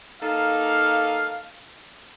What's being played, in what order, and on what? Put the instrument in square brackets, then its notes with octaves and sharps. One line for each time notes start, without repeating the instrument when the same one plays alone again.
[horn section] A#3 D#4 A4 F5